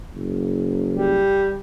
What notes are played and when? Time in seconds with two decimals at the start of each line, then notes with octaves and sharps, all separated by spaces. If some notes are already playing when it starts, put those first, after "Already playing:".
0.13 F#1
0.91 G3